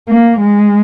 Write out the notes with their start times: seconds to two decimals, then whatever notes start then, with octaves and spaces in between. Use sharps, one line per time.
0.08 A#3
0.39 G#3